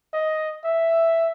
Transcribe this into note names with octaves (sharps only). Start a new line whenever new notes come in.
D#5
E5